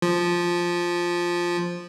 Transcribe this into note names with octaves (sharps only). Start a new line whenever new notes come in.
F3